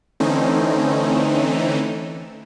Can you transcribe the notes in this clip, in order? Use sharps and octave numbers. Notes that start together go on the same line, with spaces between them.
D3 E3 A3 C4 C#4 D#4